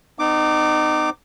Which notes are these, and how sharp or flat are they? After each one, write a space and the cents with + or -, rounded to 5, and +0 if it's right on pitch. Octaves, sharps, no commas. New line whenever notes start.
B3 +35 D#4 -25 D6 +5